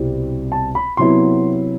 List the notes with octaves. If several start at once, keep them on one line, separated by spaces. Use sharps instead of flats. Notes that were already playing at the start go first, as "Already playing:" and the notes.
Already playing: C2 B2 G3 C4 E4
A5
B5
C3 F#3 B3 E4 C6